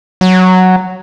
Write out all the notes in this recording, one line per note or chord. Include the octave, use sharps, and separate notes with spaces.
F#3